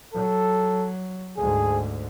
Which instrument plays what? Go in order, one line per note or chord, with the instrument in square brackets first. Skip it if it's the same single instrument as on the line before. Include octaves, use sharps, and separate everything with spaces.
[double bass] F#3 [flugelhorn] A4
[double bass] D2 G#2 [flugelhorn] G#4